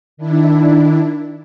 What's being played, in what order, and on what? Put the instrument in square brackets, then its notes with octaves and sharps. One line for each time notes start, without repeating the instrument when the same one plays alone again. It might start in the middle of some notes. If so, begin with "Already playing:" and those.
[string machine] D#3 D4 E4